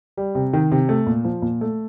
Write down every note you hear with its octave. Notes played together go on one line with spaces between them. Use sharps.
G3
C3
D#3
C3
A3
A#2
F3
A#2
A3